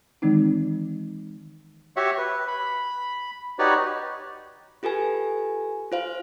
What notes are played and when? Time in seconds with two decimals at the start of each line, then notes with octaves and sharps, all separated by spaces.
0.22 D#3 E3 G#3 C4 D#4
1.96 F#4 G4 C#5 E5 F#5
2.18 B4
2.48 B5
3.59 D#4 F#4 G4 B4 C#5 D5
4.83 F4 G4 A4 B4 G#5
5.92 F4 C5 F5